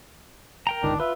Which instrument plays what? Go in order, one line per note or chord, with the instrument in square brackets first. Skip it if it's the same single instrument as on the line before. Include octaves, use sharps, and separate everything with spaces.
[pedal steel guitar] A#4 G5 A#5
[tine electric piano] G1 C#2 D#3 [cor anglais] D4
[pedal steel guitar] F4 [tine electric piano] B4 [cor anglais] E5